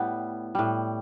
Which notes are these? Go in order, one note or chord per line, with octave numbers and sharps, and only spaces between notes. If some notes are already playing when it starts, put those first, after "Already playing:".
Already playing: A2 G3 B3
A2 G3